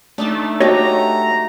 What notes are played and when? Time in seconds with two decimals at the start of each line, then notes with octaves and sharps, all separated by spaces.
0.18 A3 D4 D#4 A5
0.61 F#4 G4 C#5 D#5 A#5